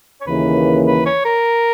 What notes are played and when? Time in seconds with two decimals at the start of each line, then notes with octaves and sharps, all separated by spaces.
0.21 C#5
0.26 D#2 C#3 E3 A#3 B4
0.87 B4
1.06 C#5
1.25 A#4